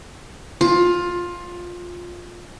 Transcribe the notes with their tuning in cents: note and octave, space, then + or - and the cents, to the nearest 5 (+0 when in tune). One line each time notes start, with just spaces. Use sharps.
F4 +15